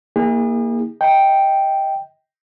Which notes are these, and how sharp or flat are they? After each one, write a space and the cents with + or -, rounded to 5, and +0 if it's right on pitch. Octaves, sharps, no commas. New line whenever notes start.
A#3 +0 E4 -45 G#4 -40
D#5 +25 G5 +0